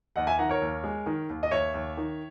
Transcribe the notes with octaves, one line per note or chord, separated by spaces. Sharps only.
D#2 D#5 F#5
E5 G#5
D#3 F#5 A#5
A#4 C#5
D#2
G#3
D#3
D#2
D#5
D#2 C#5 E5
D#2
D#3